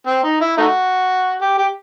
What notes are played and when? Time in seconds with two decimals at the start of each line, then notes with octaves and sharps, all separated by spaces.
0.07 C4
0.24 D#4
0.41 E4
0.58 A3 D#4 F#4
1.41 G4
1.58 G4